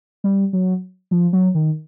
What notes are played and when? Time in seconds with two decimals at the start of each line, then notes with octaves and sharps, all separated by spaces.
0.24 G3
0.53 F#3
1.11 F3
1.33 F#3
1.55 D#3